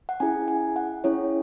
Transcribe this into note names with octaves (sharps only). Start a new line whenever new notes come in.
F#5
C#4 E4 G#4 G#5
G#5
F#5
C#4 E4 G#4 C#5